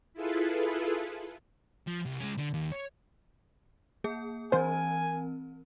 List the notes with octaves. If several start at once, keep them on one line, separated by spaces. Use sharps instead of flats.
E4 F4 G#4 A4 B4
F3
C2
G#3 C#4
D3
D#2
C#5
A#3 G#4
E3 C4 A#4 C5 G#5